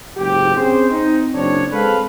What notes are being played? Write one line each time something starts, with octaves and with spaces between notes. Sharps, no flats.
F#1 G#2 G4
C4 C#4 G#4 C5
C4 D#4
F#1 C4 D4 C#5
G#3 C4 A4 B4 F5